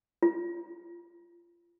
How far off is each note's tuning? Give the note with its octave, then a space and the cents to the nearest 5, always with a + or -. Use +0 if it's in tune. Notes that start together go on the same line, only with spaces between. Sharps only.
F4 -25